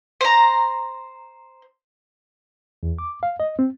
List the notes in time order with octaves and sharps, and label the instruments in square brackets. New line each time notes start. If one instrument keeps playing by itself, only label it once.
[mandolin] C5 A#5
[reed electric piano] E2
D6
F5
D#5
C4